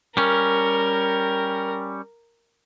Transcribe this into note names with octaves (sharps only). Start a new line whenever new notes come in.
G3 C#4 A#4